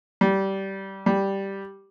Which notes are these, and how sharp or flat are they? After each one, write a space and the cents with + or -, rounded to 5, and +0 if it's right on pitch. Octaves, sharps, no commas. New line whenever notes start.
G3 -15
G3 +0